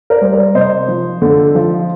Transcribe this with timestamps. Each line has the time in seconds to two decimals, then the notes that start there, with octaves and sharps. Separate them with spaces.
0.10 A#4 D5
0.21 G3 C5
0.32 A#4 D5
0.54 C3 C5 D#5
0.88 F3
1.22 D3
1.55 F3